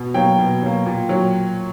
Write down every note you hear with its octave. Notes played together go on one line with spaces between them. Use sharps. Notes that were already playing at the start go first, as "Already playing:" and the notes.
Already playing: B2
F#3 A#3 G5
B2
F#3 A#3
A#2
F#3